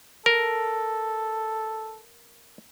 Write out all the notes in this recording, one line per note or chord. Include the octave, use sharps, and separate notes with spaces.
A4 A#4